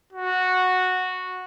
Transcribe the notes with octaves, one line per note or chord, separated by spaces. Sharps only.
F#4